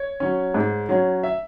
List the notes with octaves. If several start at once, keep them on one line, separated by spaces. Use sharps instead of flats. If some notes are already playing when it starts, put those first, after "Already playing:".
Already playing: C#5
F#3 C#4
G#2
F#3 C#4
E5